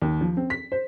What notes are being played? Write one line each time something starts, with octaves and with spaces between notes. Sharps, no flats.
D#2
F3
C4
B6
C5